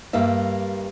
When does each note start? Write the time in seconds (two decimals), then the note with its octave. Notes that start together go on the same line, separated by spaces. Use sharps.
0.13 G2 G3 A#3 E5